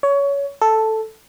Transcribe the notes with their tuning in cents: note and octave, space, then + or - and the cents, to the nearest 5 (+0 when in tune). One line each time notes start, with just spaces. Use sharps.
C#5 +20
A4 +0